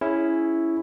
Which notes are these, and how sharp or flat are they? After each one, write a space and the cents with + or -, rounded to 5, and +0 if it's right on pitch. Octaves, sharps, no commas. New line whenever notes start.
C#4 +0 E4 +0 G#4 +0